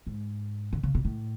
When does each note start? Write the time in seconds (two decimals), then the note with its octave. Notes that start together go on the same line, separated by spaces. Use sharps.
0.07 G#2
0.73 D3
0.83 C#3
0.95 B2
1.05 A2